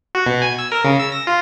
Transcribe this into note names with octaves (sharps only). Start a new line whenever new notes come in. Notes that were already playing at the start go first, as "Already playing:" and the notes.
F#4
B2
G#5
E6
A#4
C#3
E6
A#6
F4